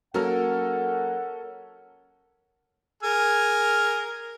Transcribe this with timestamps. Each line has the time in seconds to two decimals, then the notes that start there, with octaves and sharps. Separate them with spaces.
0.14 F#3 A#3 C#4 A4 A#4 F#5 F6
3.03 G#4 A#4 F6